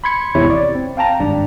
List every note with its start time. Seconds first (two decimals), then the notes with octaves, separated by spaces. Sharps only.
0.04 B5 C6 G#6 C#7
0.35 G#1 E2 C3 E4 C#5
0.50 D5
0.75 C4
0.97 F5 G5 A5 A#5 A#6
1.19 G#1 G2 D4